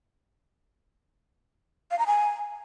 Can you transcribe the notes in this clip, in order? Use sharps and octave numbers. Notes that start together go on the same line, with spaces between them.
F5
A#5
G#5